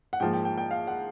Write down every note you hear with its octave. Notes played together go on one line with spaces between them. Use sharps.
F#5
G#2 F3 A#3 G5
G5
G5
G5
F5
F#5